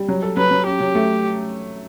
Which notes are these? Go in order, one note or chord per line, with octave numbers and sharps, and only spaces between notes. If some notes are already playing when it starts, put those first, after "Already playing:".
Already playing: G3
F#3
A4
F#3 B4
F#3
C#4 G4
F#3
A3